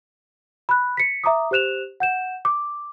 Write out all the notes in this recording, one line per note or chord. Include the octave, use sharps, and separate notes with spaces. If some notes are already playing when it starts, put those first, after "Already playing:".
B5 F#6
B6 C#7
E5 A#5 D6 D#6
G4 C5 F#6 E7 F7
F#5 G6 E7
D6